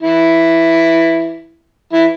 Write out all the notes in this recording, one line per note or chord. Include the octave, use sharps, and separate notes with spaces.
E3 E4
E3 E4